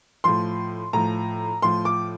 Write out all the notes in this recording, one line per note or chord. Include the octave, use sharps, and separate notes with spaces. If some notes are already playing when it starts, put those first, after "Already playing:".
A2 F3 C6
A2 F3 A#5
A2 F3 C6
D6